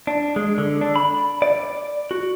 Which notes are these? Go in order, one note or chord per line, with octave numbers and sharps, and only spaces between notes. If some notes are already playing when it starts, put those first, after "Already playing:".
D4
G#3
D3
D4
B5
D5
F#4